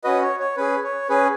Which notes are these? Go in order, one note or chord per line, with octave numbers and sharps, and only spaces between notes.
C#4 F#4 B4 D#5
C#5
C#5
C#4 G#4 B4
C#5
C#4 G#4 B4